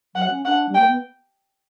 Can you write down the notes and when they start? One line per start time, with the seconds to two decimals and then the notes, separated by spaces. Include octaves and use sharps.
0.15 F#3 F#5
0.30 C#4
0.45 D4 F#5
0.69 G3
0.74 A#3 G5
0.86 B3